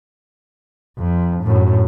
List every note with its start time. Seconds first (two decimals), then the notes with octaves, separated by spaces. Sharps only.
0.98 F2
1.43 F#2 A2